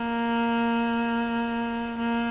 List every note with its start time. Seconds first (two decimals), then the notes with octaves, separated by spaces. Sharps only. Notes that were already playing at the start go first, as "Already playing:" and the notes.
Already playing: A#3
1.98 A#3